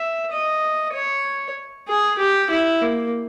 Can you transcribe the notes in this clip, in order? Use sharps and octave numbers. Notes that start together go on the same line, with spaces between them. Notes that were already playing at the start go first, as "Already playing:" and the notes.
Already playing: E5
D#5
C#5
G#4
G4
E4
A#3